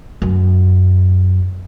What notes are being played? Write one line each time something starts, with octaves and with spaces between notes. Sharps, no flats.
F#2